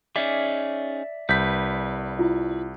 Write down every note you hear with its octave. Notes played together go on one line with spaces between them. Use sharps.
C#4 D#4 G#4 D5 E5 D6
C2 B4 G6 B6
E4 F4